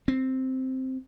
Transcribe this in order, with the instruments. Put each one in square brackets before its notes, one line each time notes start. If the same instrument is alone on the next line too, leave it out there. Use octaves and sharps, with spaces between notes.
[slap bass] C4